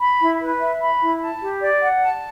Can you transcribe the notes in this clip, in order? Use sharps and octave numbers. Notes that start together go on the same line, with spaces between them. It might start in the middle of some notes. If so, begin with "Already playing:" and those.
B5
E4
B4
E5
B5
E4
A5
G4
D5
F#5
A5